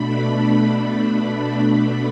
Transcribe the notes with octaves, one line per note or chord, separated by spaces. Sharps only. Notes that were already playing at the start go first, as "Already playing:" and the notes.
Already playing: B2 A3 D4 B5
B5